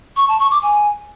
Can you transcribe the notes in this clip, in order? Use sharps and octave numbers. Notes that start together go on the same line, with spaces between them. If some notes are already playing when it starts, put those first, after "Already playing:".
C#6
A5
C#6
D6
G#5